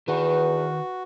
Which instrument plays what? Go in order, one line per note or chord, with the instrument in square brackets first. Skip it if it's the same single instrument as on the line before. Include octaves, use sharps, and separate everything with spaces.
[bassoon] E2 [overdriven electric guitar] D#3 [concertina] F#4 [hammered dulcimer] B4